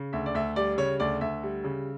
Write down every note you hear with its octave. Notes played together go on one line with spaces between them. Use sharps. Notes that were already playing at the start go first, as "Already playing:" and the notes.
Already playing: C#3
D2 E5
D5
D2 E5
G3 D5
C#3 C#5
D2 D5
D2 E5
G3
C#3